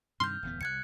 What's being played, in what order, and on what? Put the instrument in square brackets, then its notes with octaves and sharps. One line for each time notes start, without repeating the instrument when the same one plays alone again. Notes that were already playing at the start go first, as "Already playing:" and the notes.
[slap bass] G2 C3 D#3 [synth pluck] C6 [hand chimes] F6 G6
[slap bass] D1 E2 B3
[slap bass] C2 [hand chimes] F#6 G#6 C#7